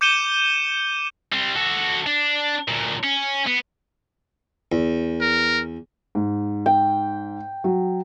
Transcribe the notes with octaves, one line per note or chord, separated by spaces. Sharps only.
D6 G6 C#7 D#7 E7 G7
G3 C4
F#4 A4
D4
D2 A#2
C#4
B3
E2
A#4
G#2
G5
F#3